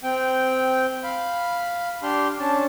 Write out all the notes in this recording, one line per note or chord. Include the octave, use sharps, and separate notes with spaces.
C4 G5
F5 B5
D4 G4 C6 F6
C#4 D4 A5